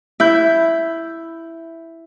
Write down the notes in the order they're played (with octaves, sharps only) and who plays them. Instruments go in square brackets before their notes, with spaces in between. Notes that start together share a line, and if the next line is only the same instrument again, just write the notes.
[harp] E4 G6